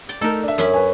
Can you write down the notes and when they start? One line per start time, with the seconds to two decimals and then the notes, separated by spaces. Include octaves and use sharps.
0.09 D5 G5
0.21 A3 D#4 A4 A#4
0.43 D4 E5
0.58 F#2 C#4 B5
0.74 B4 G#5